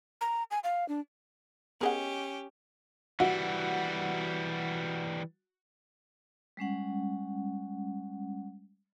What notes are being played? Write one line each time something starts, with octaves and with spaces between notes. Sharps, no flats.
A#5
G#5
F5
D4
B3 C#4 G4 G#4 A#4 D#5 F#5
E3 G3 F#4
G3 G#3 C#4 F#5